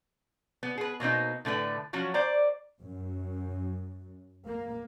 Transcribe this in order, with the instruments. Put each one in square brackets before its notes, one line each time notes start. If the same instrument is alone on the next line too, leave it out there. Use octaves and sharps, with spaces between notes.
[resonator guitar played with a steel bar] B3
G#4 B4
B2 A#3 C4 D#4
A2 D3 A3 B4
F3 F#3 C#4 F#4
C5 D5 A#5
[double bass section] F#2
A#3